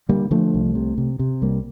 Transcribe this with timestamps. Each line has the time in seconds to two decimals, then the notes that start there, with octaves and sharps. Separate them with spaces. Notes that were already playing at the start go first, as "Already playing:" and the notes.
0.09 D3 G3 A#3
0.31 D3 F3 A3
0.54 C2
0.75 C3
0.98 C3
1.19 C3
1.42 C2 G3 A#3